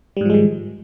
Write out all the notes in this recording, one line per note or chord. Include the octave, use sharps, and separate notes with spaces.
G#2 D#3 F3 G3 G#3